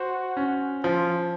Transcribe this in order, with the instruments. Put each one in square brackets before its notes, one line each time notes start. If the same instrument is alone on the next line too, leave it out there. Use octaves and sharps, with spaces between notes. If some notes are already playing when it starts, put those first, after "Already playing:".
Already playing: [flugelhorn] F#4 [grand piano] C5
[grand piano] C#4
[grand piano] F3 [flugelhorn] F4